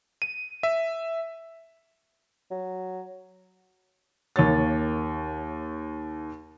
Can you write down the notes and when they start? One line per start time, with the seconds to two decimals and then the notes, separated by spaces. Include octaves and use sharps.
0.22 D#7
0.63 E5
2.51 F#3
4.36 D#2 A#3 C#5 A6